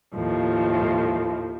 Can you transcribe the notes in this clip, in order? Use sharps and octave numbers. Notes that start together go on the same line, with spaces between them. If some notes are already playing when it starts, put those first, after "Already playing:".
D#2 A2 F3